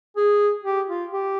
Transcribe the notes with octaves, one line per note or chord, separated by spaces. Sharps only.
G#4
G4
F4
G4